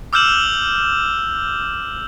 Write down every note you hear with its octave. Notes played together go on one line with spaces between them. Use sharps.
D6 E6 F6 G6 E7 F#7